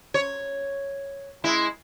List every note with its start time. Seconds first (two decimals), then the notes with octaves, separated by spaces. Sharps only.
0.14 C#5
1.44 G#3 E4